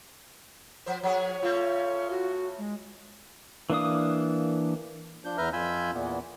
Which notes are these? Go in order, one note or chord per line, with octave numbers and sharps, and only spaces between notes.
F3 C5
F3 G#4 C#5
C#3 A3 F4
F#4
G#3
E3 A#3 D4 F5 D#6
F3 D4 G6
E2 B4 E5 A#5 F6 G6
F2 F4 G#5 B5 E6 G6
E2 A#2 E3 B3